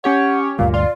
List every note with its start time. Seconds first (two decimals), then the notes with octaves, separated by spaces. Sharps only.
0.04 C#4 G4 C#5 F#5
0.59 G1 D2 A#2 F5
0.74 F4 D5